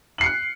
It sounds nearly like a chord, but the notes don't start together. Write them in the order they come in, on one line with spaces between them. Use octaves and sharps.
F#7 C7 C#7 F#6